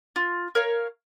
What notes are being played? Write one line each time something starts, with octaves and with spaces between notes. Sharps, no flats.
F4
A#4 C#5 F5